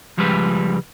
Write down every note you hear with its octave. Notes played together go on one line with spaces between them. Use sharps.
C#2 F3 G3 G#3 B4